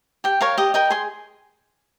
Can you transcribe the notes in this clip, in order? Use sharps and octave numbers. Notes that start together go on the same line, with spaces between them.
G4 G5
A#4 C#5 F5
G4 D#5
A#4 D#5 G5
G#4 C6